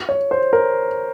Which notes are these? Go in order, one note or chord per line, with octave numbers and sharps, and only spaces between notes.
C#5
C5
A#4